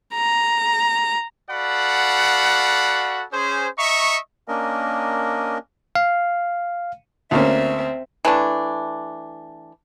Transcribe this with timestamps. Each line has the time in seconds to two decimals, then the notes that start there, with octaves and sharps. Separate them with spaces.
0.14 A#5
1.51 F#4 A4 D5 F5 F#5 B5
3.33 C#4 G#4 C5
3.79 D#5 E5 A#5 C#6
4.48 A#3 C#4 D4 A#4 D#5
5.95 F5
7.31 D2 A#3 C4 C#4 E5
8.25 E3 A3 D4